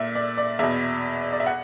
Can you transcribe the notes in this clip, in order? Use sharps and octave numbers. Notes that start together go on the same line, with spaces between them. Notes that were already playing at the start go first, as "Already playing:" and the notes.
Already playing: A#2 E5
D5
D5
E2 B2 E5
D5
E5
F#5